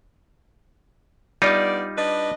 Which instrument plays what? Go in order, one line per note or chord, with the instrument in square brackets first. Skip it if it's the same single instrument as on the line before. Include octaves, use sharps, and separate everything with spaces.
[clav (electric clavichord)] G3 D#4 F4 [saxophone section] B3 D4 D5
[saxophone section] D4 B4 D#5